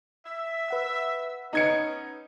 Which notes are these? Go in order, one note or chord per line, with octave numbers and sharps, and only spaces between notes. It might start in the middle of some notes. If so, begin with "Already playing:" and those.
E5
B4 F#5 E6
B3 C#4 D#4 G#6 C#7